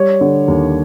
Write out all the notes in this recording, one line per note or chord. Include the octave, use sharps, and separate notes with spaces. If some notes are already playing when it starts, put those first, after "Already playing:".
Already playing: G3 C#5
D3
D#2